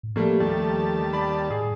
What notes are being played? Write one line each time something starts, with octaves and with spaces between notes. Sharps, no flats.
A2
F3 G3 A3 A#3
D#2 G3 A3 A5
D5 B5
A2 G#4